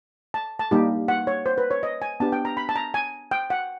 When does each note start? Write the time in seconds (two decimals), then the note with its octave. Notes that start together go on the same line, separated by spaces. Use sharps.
0.34 A5
0.59 A5
0.71 G3 A#3 D#4 G4
1.08 F#5
1.27 C#5
1.46 C5
1.58 B4
1.71 C#5
1.83 D#5
2.02 G#5
2.20 B3 D4 G4 A5
2.32 G5
2.45 A#5
2.57 B5
2.69 A5
2.76 A#5
2.94 G#5
3.31 G5
3.50 F#5